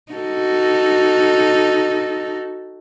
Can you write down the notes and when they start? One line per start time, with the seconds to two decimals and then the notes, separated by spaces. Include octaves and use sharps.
0.12 D#4 F#4 A4